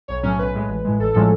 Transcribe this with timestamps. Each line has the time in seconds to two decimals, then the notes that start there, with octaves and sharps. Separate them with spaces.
0.08 B1 C#5
0.23 A2 F#3 C#4
0.38 B1 B4
0.54 A2 G#3
0.68 A1
0.85 A2 G#3
0.99 A1 A4
1.14 A2 F3 G#3 C#4 A4